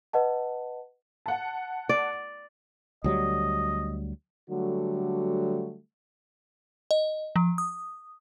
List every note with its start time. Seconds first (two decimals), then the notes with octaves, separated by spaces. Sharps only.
0.13 B4 D#5 F#5 A5
1.26 F#5 A5
1.89 D5
3.04 D2 F#3 G3 D#5
4.50 D3 F#3 G3 A3 F#4
6.91 D#5
7.36 F3
7.58 D#6